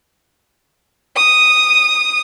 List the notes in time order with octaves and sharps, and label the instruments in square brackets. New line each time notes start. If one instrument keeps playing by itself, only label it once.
[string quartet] D#6